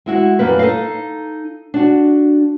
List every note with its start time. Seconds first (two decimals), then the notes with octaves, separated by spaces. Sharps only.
0.06 G#3 E4 F#4
0.39 F#2 G3 A#3 B4
0.59 D#4 A4 F5
1.74 D4 F#4